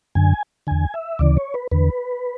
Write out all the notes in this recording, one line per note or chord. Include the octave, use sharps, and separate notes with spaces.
F#2 D3 G#5
E2 D3 G#5
E5
D2 C#3 E3 D5
C#5
B4
E2 D3 B4